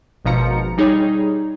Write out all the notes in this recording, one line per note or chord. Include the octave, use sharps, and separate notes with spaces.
G#1 B2 F3 A#5 C#7
G3 D#4 G#4 C#5